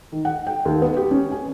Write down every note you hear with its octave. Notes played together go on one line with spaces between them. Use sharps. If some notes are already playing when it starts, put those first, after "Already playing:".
D#3
F#5
G5
D#2
B3
G4
C#4
G#5